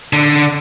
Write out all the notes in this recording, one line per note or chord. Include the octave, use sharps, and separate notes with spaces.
D3